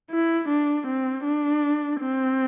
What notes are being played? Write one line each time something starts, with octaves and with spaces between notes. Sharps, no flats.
E4
D4
C4
D4
C4